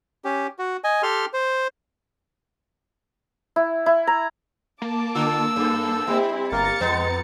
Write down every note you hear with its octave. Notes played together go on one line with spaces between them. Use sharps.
C#4 G4
F#4
D#5 G#5
G4 A4 C6 F6
C5
E4
E4
A#5
A#3 A5 D6
D3 F4 E6
F#2 A4
G3 C4 E4
G1 A#3 A#4 A#5 A6 C#7
F2 G#3 B3